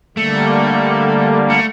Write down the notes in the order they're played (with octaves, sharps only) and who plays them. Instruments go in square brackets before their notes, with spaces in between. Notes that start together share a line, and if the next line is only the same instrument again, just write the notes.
[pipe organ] D3 G3 A#3 [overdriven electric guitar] A3
[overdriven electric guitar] A3